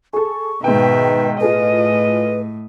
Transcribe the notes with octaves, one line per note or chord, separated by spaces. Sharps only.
G#4 A4 C#6
G#2 B2 D#3 B4 E5 G5
A2 F4 G#4 A4 B4 D#5